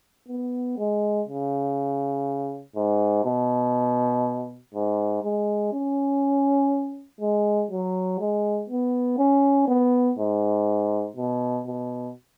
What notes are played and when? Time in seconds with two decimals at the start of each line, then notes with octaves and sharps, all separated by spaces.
0.29 B3
0.78 G#3
1.28 C#3
2.76 G#2
3.25 B2
4.75 G#2
5.23 G#3
5.73 C#4
7.21 G#3
7.71 F#3
8.20 G#3
8.70 B3
9.18 C#4
9.68 B3
10.19 G#2
11.17 B2
11.67 B2